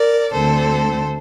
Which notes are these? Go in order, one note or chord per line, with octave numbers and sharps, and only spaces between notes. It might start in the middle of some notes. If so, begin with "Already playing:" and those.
Already playing: A#4 D5
D2 D3 A3 C4 A4 C5